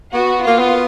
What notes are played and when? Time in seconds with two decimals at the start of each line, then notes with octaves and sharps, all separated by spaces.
0.14 B3 F#4
0.43 A#3 F4
0.59 B3